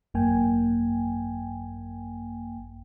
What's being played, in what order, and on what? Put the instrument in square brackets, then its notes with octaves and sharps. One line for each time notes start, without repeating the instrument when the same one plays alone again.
[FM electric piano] G#1 F#2 A#3 G5 G#5